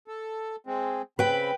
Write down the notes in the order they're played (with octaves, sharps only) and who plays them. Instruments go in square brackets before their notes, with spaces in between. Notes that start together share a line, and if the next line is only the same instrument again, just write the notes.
[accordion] A4
G#3 C4
[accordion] C#3 C4 B5 [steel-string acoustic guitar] B4 G5